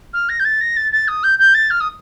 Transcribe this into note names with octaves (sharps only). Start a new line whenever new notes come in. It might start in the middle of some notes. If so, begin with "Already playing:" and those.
F6
A#6
G6
A6
A#6
A6
A6
D#6
G6
G6
A6
F6
D#6